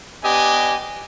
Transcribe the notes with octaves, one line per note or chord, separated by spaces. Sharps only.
B3 D4 G4 D#5 G#5